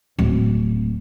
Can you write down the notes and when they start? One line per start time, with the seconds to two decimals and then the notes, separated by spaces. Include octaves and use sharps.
0.19 D1